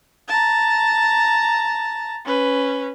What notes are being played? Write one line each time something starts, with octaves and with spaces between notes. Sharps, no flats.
A5 A#5
C#4 B4